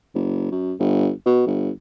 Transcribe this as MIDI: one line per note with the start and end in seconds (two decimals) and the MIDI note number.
0.15 0.48 30
0.52 0.73 42
0.79 1.10 31
1.26 1.44 47
1.47 1.70 31